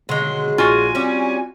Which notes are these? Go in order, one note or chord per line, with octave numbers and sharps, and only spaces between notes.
B2 D3 D#3 F#3 G#3 C6
A#1 F4 F#4 G#5
G3 C4 C#4